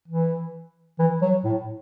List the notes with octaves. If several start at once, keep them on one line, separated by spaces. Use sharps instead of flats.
E3
E3
F#3
A2